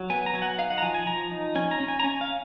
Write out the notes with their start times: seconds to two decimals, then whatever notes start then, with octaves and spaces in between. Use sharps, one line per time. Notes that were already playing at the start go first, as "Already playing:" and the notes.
Already playing: F#3
0.10 B3 G#5
0.26 A#5
0.34 F#3 G#5
0.42 F#5
0.58 D#4 F5
0.70 F#5
0.78 A#5
0.82 F3 G#5
0.94 G#5
1.07 F3 A#5
1.31 D#4
1.55 C#4 G#5
1.71 A#5
1.80 C#4
1.88 G#5
2.00 A#5
2.04 C#4 G#5
2.21 F5